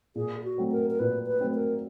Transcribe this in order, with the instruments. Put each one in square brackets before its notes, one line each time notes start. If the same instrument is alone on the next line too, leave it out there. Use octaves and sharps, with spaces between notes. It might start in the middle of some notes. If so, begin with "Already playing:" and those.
[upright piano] A#2 [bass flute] G#4
[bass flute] F#4
[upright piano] F#3 A3 C4
[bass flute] A#4
A#4
[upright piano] A#2 [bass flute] B4
[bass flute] B4
[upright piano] F#3 A3 C4
[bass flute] A#4